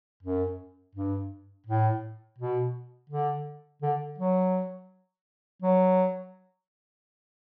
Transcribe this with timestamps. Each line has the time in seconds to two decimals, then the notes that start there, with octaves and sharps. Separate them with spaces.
0.23 F#2
0.95 G2
1.66 A2
2.38 B2
3.10 D3
3.82 D3
4.18 F#3
5.62 F#3